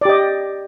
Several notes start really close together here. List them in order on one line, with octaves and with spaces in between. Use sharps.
D5 G4 D#5